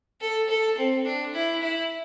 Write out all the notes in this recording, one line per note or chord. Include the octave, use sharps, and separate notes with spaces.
A4
A4
C4
D4
E4
E4